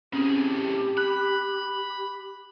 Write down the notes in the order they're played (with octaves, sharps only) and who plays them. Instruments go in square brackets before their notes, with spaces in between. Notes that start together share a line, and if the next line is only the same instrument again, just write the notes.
[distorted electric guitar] A2 G#4 [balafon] C4 C#4 [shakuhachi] G4
[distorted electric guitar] B5 [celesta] F#6